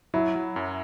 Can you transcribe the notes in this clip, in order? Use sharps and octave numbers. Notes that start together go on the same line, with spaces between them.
F#3 E4
F#3
F#2